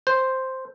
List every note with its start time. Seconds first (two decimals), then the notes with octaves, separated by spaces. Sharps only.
0.07 C5